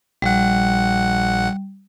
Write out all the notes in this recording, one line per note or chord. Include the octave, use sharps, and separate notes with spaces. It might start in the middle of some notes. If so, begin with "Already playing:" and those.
A#1 G3 F#5